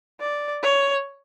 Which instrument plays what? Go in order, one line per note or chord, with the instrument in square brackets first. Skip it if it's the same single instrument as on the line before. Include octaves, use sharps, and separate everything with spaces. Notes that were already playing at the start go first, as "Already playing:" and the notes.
[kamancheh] D5
C#5